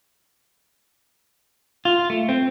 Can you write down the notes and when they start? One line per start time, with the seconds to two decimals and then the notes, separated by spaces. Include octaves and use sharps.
1.85 F4
2.10 A3
2.29 C4